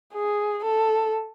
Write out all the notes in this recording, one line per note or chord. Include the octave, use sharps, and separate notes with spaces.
G#4
A4